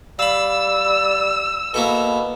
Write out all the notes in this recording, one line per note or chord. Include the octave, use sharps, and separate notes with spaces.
G3 F5 B5 E6
B2 A#3 E4 A4